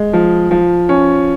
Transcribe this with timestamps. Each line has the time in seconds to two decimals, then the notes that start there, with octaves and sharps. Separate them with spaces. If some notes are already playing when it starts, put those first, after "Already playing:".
Already playing: G#3
0.13 F3
0.51 F3
0.89 C#4